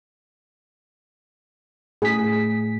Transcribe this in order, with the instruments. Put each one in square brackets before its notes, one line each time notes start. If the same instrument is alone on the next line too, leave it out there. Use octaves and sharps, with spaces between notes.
[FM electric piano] A2 B6 [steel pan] G#4